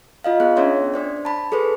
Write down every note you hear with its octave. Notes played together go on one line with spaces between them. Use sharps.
F4 D#5 F5
B3 G#4 F#6
C#4 D4 G#4 C#5 E5 C6
D4 C5 D5
A5 B5
G#4 A4 B4 C5